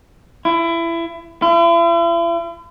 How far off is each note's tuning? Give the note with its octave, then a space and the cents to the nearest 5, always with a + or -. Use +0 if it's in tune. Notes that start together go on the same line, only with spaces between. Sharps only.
E4 +25
E4 +45